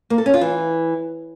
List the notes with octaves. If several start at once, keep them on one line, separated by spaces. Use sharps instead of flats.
A#3
A4
C#4
F4
E3